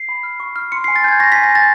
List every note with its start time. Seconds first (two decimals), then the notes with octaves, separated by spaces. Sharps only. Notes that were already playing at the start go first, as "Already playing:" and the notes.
Already playing: C7
0.09 B5
0.23 F6
0.40 C#6
0.56 F6
0.72 C6 C#7
0.84 G#5 C7
0.96 A6
1.04 G#5 G6 G#6
1.20 C#6 A#6
1.32 G#5 B6
1.44 A#6
1.51 G#5 A6